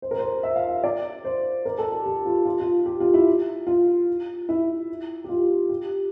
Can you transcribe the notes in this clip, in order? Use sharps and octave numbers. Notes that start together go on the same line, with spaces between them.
C5
A#4
C5
E5
F5
E5
D5
C5
A#4
A4
G4
G4
F4
F4
F4
G4
F4
E4
F4
E4
G4
F4
G4